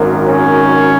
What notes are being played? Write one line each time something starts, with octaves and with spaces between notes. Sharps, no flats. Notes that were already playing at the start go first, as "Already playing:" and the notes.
Already playing: G#1 F#2 D#3
C#4